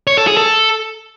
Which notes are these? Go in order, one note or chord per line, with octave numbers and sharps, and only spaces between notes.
C#5
A4
G#4
A4